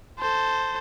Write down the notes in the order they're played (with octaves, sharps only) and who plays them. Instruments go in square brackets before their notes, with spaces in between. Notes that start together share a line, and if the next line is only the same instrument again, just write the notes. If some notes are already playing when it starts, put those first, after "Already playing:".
[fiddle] A4 [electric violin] C5